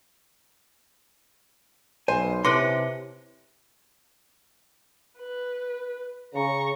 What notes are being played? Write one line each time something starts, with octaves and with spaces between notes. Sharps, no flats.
B1 C5 G#5
C3 E4 B4 C#5 C6 D6 A#6 C#7
B4
C#3 A#5 C#6